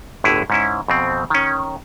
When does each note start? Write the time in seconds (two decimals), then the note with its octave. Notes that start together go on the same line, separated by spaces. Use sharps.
0.24 G1 A2 D3 E4 G#4
0.50 G#2 C#4 E4
0.88 F2 B2 C4
1.30 D#3 C#4